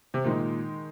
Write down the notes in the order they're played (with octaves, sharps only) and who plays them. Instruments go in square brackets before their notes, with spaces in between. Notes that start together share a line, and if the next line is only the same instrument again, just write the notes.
[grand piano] C3
[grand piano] A#2 [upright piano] D#3 G#3 D#4